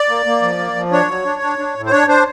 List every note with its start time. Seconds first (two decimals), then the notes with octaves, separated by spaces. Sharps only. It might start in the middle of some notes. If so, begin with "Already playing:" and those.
Already playing: D5
0.09 A#3
0.26 A#3
0.42 F3
0.58 A#3
0.76 F3
0.92 D4 C#5
1.08 F#3
1.25 D4
1.42 D4
1.58 D4
1.75 A2
1.86 C5
1.91 D4 C#5
2.08 D4 C5